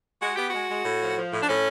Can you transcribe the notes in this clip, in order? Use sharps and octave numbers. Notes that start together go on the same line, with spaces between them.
G#3 F#4
B3 G4
G#3 F#4
G#3
A2
F3
F3
A2
D4
A2 C#4